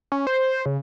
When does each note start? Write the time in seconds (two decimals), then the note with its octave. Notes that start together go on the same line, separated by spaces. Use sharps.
0.12 C#4
0.27 C5
0.66 C#3